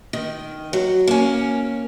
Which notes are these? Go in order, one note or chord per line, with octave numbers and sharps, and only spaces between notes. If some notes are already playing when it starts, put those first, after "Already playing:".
D#3
F#3
A#3 C#4